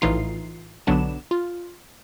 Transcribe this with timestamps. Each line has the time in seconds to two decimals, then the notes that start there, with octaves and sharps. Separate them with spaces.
0.01 A#1 A2 E3 D#4 F4 C7
0.87 B1 D3 F#3 B3 D4 E7
1.31 F4